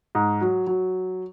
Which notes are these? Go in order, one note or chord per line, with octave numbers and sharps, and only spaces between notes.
G#2
F#3
F#3